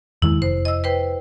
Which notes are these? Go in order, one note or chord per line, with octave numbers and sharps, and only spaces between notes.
E2 D#3 G#3 E4
F1 C5
D#5 E6
B4 C5 G5